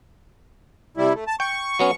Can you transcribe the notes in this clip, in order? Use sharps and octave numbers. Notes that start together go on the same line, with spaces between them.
C3 G3 E4
A3
A5
G5 C#6
F#3 B3 C#4